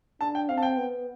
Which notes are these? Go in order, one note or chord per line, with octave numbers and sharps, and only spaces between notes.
D4 A5
G5
C4 F5
A5
G5
B3